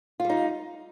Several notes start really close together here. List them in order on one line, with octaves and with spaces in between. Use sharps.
F4 G3 D#4